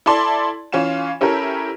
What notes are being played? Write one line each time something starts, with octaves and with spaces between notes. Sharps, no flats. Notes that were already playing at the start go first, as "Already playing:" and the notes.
E4 A4 D5 A5 C6
E3 C#4 F4 F5 E7
C#4 E4 G4 A4 A#4